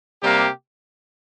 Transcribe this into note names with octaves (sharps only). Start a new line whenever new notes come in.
C3 G3 A#3 G4